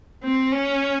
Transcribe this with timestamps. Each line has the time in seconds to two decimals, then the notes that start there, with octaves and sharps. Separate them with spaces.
0.24 C4
0.52 C#4